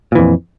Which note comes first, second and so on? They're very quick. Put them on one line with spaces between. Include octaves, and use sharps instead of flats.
A#2 E3 F2